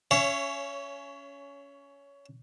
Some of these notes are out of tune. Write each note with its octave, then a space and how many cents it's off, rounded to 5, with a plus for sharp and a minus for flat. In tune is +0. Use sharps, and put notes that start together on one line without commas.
C#4 +20 C#5 +0 E5 +40